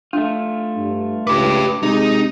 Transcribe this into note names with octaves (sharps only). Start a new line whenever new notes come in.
A3 D4 F4
G2
C#2 G4 B4 D6
C3 G#3 D#4